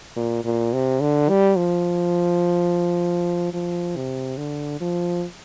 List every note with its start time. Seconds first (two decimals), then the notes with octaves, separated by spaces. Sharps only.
0.16 A#2
0.45 A#2
0.73 C3
1.00 D3
1.29 G3
1.57 F3
3.53 F3
3.96 C3
4.38 D3
4.80 F3